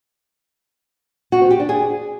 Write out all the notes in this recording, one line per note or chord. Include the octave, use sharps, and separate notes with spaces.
F#4
C4
G4
D4
G#4